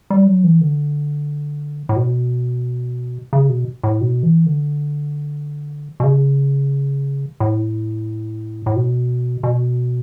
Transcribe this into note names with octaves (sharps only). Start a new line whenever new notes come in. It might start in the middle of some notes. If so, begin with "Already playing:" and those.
G3
F#3
E3
D3
A2
B2
C#3
B2
A2
B2
E3
D3
B2
C#3
A2
A2
B2
B2